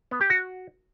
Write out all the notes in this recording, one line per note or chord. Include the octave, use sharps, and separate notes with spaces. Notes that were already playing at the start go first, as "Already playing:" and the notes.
B3
G4
F#4